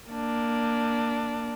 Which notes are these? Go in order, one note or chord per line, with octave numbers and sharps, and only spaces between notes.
A#3 D4